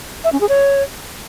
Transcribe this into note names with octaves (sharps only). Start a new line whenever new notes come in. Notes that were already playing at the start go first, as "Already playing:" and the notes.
E5
C#4
G#4
C#5